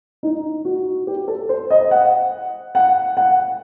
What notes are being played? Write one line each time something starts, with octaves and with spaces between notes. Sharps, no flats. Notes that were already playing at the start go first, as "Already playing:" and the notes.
D#4
F#4
G4
A4
C5
D#5
F#5
F#5
F#5